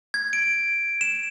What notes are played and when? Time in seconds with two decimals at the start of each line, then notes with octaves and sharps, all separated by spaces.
0.14 G#6
0.33 D7
1.01 E7